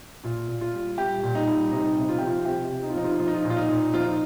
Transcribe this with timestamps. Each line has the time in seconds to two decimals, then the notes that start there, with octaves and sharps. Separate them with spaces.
0.24 A#2 F4
0.48 A#2
0.61 F4
0.73 G3
0.98 G3 G4
1.23 A#2
1.35 D#4
1.48 G3
1.72 C3 D#4
1.97 C3
2.09 F4
2.19 F3 G4
2.27 F4
2.45 C3 G4
2.71 C3
2.83 D#4
2.90 F4
2.95 F3 D#4
3.04 F4
3.12 D#4
3.19 F3 F4
3.28 D#4
3.34 F4
3.43 A#2 D#4
3.50 F4
3.57 D#4
3.68 A#2
3.94 F3 F4
4.04 D#4